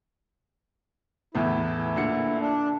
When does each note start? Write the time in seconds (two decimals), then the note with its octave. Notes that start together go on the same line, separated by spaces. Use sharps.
1.35 E2 A2 B3 E4
1.96 A#2 D3 C#7
2.41 D4